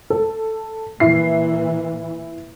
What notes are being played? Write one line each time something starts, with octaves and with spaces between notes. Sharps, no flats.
A4
A#2 E3 E4 C7